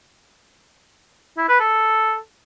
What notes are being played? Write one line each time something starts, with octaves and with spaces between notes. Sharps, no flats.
E4
B4
A4